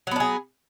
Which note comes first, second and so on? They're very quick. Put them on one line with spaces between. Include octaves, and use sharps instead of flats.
F#3 B3 D4 G#4